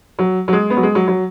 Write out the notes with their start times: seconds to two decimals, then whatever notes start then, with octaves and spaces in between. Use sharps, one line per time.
0.19 F#3
0.48 F#3
0.53 G#3
0.70 B3
0.77 F#3
0.83 G#3
0.95 F#3
1.08 F#3